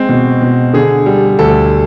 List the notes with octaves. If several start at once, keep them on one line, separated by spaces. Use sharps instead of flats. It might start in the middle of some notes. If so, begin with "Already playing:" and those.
Already playing: G#3 C4
B2
B2
D3 G#4
G3
D2 A4